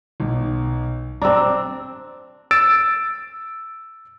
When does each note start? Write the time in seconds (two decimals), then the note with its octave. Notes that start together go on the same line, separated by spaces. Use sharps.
0.20 B1
1.22 C4 D4 A#5 E6
2.51 E6 A6 D7